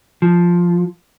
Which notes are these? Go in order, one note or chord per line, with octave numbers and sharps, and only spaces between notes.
F3